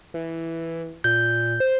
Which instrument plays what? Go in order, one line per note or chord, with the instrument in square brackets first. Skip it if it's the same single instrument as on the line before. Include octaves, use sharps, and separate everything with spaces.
[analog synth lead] E3
[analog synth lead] A#2 [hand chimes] G6
[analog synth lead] C5